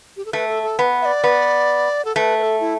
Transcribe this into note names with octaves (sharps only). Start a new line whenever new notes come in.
G4
A4
A3 B4
A4
A4
B3
E5
D5
B3
A4
A3 B4
B4
A4
E4